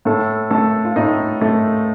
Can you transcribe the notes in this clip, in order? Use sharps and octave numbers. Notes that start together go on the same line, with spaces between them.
A2 A4
A3 A4
F4
A2 D#4
A3